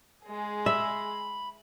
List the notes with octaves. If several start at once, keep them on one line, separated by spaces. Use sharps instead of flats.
G#3 G#4
E5 B5